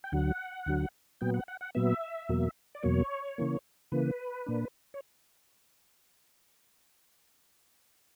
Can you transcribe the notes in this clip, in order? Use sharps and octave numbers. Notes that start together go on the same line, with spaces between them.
G5
D2 D3 F#3 F#5
D2 D3 F#3
A#2 F#3 B3 G5
F#5
F#5
F#5
A#2 F#3 B3 E5
E2 B2 F#3 A#3
D5
E2 B2 F#3 A#3 C#5
C#3 E3 A#3
C#3 E3 A#3 B4
A#2 A#3 D4
C#5